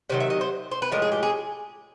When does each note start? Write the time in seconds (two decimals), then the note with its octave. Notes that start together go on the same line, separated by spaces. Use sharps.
0.10 C3 D#3 F#3 C5
0.20 E5
0.30 D#5
0.41 C5
0.71 C5
0.82 B4
0.92 A2 F3 G#3 A#4
1.02 G#4
1.12 G4
1.23 G#4